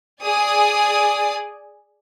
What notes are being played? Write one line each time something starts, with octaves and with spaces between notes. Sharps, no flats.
G#4 D5 G#5 D#6